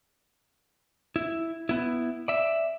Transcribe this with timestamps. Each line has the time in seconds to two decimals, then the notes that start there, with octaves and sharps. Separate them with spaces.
1.16 E4
1.69 B3 E4
2.28 D5 E5